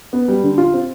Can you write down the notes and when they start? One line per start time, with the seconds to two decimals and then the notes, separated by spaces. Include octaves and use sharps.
0.13 B3
0.28 G3
0.44 D3
0.58 F4
0.74 C4